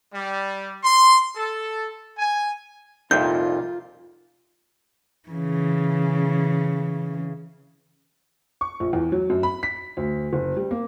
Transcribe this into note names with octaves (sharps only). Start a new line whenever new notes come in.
G3
C6
A4
G#5
C2 F2 A#2 D#4 F4 E5 G6
C#3 E3
C#6
A#1
E2
F#3
F#2
B5
B6
D2
F#1
G3
A#3